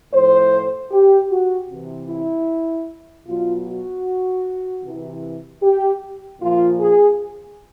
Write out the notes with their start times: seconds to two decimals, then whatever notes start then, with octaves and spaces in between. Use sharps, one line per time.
0.12 A2 F3 C5
0.91 G4
1.30 F#4
1.70 C3 E3
2.09 E4
3.27 B2 F#3 F4
3.66 F#4
4.84 C3 E3
5.63 G4
6.41 A#2 F3 F4
6.80 G#4